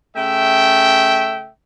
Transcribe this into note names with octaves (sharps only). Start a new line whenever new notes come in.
C#3 A3 E5 G5